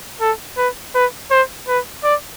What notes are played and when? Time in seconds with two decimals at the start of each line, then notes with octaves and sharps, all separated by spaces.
0.21 A4
0.57 B4
0.95 B4
1.31 C5
1.68 B4
2.04 D5